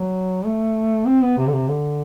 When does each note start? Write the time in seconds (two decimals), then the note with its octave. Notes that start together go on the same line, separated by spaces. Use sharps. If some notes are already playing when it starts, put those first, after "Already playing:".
Already playing: F#3
0.46 A3
1.07 C4
1.23 B3
1.37 C3
1.47 D3
1.53 C3
1.68 D3